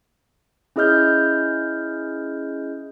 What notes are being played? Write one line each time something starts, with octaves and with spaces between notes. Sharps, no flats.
C#4 E4 G#4 D#5 F6 G6